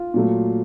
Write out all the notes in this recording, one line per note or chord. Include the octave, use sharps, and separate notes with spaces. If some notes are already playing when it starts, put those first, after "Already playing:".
Already playing: F4
A#2 F#3 A3